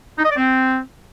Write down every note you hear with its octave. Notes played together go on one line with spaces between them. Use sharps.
D#4
D#5
D5
C4